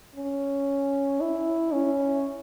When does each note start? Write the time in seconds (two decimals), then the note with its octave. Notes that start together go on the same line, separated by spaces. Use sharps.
0.15 C#4
1.21 E4
1.73 C#4